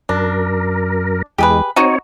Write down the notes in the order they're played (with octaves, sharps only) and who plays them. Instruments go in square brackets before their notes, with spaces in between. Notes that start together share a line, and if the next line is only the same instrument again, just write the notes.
[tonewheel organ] F#2 A#4 [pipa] D4
[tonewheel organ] E2 G#3 [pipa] G4 G#4 B4
[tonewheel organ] C4 C#5 [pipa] D#4 F#4